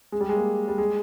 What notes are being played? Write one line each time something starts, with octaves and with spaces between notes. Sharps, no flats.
G#3
G3
G#3
A#3
G3
G#3